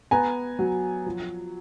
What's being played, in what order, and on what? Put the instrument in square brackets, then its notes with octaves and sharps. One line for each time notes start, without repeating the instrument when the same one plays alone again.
[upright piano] B3 G#5 A#5
F#3
F3